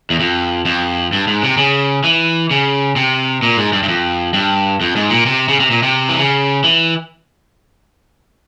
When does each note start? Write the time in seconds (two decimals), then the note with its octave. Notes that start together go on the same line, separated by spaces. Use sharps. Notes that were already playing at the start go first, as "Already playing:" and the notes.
0.10 E2
0.20 F2
0.65 F2
1.13 G2
1.27 G#2
1.43 C3
1.57 C#3
2.04 E3
2.51 C#3
2.96 C3
3.43 A#2
3.57 G#2
3.73 G2
3.83 G2
3.88 F2
4.34 G2
4.81 F2
4.96 G#2
5.10 A#2
5.26 C3
5.48 C#3
5.60 C3
5.71 A#2
5.83 C3
6.09 E3
6.19 C#3
6.64 E3